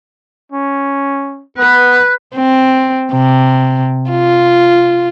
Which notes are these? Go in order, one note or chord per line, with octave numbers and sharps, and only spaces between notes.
C#4
B3 B4 F#6
C4
C3
F4